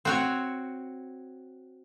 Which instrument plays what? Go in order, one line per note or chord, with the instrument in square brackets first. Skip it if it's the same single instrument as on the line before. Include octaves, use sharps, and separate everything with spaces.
[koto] C4 F#4 C#5